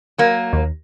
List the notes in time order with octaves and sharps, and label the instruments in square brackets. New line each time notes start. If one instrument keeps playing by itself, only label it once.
[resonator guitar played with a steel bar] F#3 A#3
[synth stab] D#2